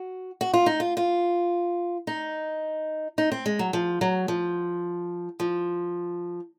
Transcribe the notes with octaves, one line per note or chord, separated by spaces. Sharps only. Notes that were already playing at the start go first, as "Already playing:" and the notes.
Already playing: F#4
F#4
F4
D#4
F4
F4
D#4
D#4
C4
G#3
F#3
F3
F#3
F3
F3